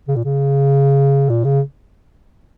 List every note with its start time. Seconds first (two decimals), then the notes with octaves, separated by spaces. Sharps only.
0.08 C#3
0.16 A#2
0.24 C#3
1.29 A#2
1.44 C#3